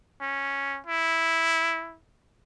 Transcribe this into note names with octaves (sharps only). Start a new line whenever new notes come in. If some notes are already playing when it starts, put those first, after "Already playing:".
C#4
E4